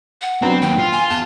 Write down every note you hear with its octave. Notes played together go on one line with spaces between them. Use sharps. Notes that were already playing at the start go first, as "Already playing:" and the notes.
F#5
F#3 B3 C4 D4
D#2 G5
F4
G#5
E2 A5